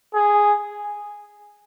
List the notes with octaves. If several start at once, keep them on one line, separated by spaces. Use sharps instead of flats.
G#4